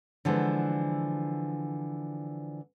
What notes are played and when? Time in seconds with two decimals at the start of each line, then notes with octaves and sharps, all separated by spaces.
0.25 D3 E3 F3 G#3 B3